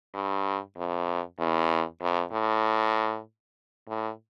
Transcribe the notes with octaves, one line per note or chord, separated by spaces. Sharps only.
G2
F2
E2
F2
A2
A2